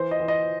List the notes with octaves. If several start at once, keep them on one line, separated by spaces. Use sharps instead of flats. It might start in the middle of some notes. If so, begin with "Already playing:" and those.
Already playing: E3 C5
D#5
E3
D#5